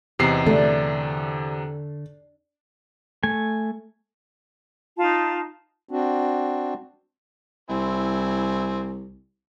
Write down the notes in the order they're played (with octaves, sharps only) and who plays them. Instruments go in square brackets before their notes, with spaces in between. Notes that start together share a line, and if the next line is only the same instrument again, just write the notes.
[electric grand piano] E2 C3 C7 [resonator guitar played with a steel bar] D#4 G4
[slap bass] D3 [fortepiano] A3 [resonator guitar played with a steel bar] D4
[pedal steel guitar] A3 G#5
[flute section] D#4 F4 A5
[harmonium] C4 D4 F#4
[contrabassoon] C2 [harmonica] C4 E4 G#5